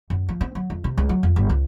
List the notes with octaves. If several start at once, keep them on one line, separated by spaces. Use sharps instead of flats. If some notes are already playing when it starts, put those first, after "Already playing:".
F#2
F3
C4
F#3
F2
C3
C#2
F#3
F2
G1
C#2